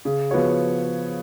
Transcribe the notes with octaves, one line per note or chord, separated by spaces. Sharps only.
C#3
F3 B3 F#4 C#5